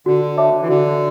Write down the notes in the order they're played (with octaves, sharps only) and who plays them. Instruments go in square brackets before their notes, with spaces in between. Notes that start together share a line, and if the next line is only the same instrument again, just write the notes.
[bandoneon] D3 [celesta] F#4
[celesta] C#5 E5 A5 D6
[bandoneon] E3
[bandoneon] D3 [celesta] F#4